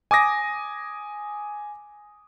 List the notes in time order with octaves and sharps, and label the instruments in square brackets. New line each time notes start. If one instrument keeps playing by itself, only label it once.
[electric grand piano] G#5 D6 D#6 A#6 D7